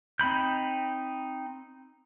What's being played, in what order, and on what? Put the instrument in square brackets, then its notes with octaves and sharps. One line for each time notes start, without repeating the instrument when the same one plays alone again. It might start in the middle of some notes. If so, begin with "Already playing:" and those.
[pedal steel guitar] C4 D#4 B5 G6